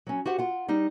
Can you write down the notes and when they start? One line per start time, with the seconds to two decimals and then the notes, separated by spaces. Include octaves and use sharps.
0.07 F#3 C#4
0.26 F#4 G4 C5 F#5
0.38 F4 F#5
0.68 G3 D#4